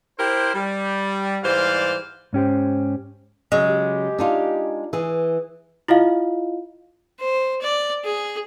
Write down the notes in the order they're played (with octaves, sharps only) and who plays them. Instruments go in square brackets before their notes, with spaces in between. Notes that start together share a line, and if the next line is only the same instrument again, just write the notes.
[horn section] E4 G4 A#4 C5
G3
G#2 E3 G3 C5 D5 F5
[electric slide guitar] G#2 C#4 G4 C5
[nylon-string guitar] C#3 F#3 [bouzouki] G#3
[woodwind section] G4
[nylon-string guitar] D4 D#4 F4
E3 G#4
[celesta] E4 F4 D#5 F5
[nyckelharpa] C5
D5
G#4